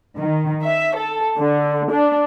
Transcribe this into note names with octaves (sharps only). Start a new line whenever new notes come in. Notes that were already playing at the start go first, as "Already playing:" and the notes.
D#3
E5
A4
D3
D4